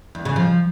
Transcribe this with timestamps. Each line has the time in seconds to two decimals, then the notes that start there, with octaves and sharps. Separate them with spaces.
0.15 E2
0.25 C#3
0.36 F3